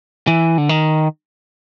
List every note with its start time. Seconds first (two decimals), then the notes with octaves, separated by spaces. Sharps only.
0.27 E3
0.58 D3
0.69 D#3